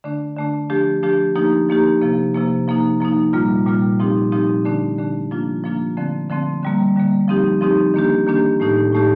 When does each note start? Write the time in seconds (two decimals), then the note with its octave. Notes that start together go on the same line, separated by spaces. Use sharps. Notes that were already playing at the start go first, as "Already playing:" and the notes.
0.04 D3 A3 D4
0.37 D3 A3 D4
0.70 F3 A3 D4 G4
1.03 F3 A3 D4 G4
1.35 F3 A#3 D#4 G4
1.69 F3 A#3 D#4 G4
2.01 C3 F3 A#3
2.34 C3 F3 A#3
2.68 F3 A#3 D#4
3.00 F3 A#3 D#4
3.33 A#2 G3 A#3 F4
3.66 A#2 G3 A#3 F4
3.99 A#2 F3 C4 D#4 G4
4.32 A#2 F3 C4 D#4 G4
4.65 D3 A3 D4
4.98 D3 A3 D4
5.31 F3 A#3 D4 F4
5.64 F3 A#3 D4 F4
5.97 D3 F3 A3 C4
6.30 D3 F3 A3 C4
6.63 D3 G3 A#3
6.96 D3 G3 A#3
7.28 F3 C4 D#4 G4
7.61 F3 C4 D#4 G4
7.94 D#3 A#3 D4 G4
8.27 D#3 A#3 D4 G4
8.60 A2 A3 D#4 G4
8.93 A2 A3 D#4 G4